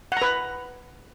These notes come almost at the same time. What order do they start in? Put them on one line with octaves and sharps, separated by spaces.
F#5 A#5 B4